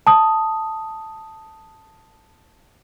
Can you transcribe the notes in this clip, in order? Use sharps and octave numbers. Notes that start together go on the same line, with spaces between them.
A5 D#6